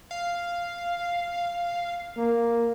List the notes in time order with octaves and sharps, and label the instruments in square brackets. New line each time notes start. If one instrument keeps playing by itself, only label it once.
[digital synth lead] F5
[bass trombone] A#3